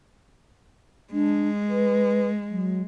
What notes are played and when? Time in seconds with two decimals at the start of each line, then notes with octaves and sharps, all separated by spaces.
1.13 G#3 D4
1.69 B4
2.51 F#3